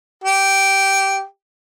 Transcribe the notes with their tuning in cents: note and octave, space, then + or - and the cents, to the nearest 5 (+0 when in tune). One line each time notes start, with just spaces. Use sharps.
G4 -10